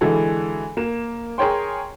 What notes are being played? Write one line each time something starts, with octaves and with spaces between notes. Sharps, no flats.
D3 E3 G#3 F#4 A4
A#3 E7
G#4 A#4 C#5 G5 C6